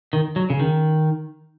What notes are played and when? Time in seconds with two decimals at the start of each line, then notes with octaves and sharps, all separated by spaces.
0.13 D#3
0.36 F#3
0.50 C#3
0.60 D#3